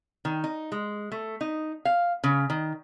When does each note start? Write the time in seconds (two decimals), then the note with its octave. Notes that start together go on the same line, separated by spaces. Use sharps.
0.25 D#3
0.44 D#4
0.72 G#3
1.12 A3
1.41 D#4
1.85 F5
2.24 C#3
2.50 D#3